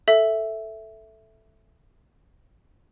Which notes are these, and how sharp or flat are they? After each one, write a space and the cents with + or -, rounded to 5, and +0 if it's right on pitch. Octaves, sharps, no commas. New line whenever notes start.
A4 +0 E5 +0